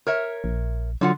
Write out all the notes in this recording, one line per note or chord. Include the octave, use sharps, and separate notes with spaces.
A#4 C#5 E5
A#1
D3 F#3 F4 F#5